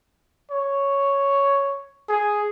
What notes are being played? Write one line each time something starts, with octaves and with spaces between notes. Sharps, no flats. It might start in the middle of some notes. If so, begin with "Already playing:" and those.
C#5
G#4